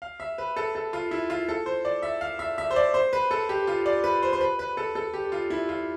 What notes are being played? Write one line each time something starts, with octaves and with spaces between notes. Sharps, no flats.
F5
E5
B4
A4
A4
F4
E4
F4
A4
C5
D5
E5
F5
E5
E5
C5
D5
C5
B4
A4
G4
F4
D5
B4
C5
C5
B4
B4
A4
A4
G4
F4
E4
F4